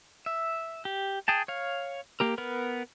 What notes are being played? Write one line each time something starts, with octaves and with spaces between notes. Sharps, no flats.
E5
G4
G#4 G5 A5
C#5 F5
A#3 G4 A#4
B3 A#4 B4